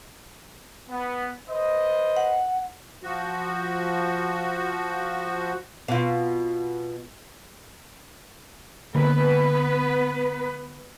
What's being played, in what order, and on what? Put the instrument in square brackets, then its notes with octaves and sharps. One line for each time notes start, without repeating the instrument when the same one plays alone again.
[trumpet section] B3
B4 C5 D#5
[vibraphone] F#5
[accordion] F3 F#4
[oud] B2 F4
[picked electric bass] D3 A#3 [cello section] B3 B4